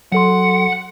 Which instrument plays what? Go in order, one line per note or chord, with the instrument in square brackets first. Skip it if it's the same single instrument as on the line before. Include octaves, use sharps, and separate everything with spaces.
[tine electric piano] F#3 A4 C6 [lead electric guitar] F#5